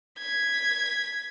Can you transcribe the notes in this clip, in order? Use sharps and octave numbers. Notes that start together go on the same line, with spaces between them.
G#6 B6